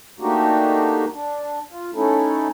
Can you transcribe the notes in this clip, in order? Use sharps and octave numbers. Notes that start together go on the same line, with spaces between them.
A3 A#3 D4 D#4 F#4 G4
D4
F4
A3 C#4 D#4 E4 A4